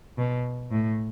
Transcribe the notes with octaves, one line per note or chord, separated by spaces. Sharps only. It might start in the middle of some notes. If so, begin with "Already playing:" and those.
B2
A2